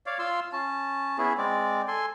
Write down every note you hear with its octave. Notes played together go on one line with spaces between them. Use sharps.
C#5 D5 F5
F4 F5 C6 E6
C#4 A5
B3 C#4 E4 G#4
G#3 C4 D5
A4 G#5 C6